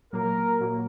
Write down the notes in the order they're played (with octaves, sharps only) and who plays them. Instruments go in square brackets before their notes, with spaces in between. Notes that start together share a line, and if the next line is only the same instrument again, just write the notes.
[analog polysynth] A#2 F#3 A#3 [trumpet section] A#4
[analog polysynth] A#2 F#3 A#3